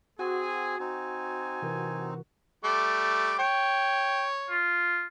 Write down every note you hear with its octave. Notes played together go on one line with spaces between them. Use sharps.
C4 F#4 G#4 G#5
C4 D#4 G#5
C3 E3 A#4
G3 A3 D6
C#5 G5
F4